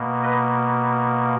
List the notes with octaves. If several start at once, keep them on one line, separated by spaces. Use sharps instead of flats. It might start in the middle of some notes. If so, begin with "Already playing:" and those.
Already playing: B2 A#3
B4 D#5